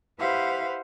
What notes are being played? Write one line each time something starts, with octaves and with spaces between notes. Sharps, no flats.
E4 G4 B4 C5 F5 F#5